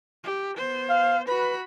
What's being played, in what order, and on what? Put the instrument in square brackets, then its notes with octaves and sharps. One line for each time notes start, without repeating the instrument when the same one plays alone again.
[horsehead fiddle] G4
B3 C5
[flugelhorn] F5
[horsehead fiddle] F#4 B5 [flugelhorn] B4